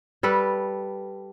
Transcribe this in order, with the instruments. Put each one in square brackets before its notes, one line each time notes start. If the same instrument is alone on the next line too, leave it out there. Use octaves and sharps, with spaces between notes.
[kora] G3 A4 B4